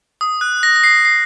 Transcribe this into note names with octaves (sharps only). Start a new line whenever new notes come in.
D#6
F#6
A#6
A#6
C7
C7